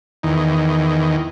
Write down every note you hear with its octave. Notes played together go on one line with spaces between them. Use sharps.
E2 D#3